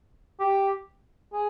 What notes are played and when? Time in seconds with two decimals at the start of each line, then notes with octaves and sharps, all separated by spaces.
0.40 G4
1.32 G#4